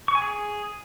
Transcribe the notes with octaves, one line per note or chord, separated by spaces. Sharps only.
C#6
G#5
G#4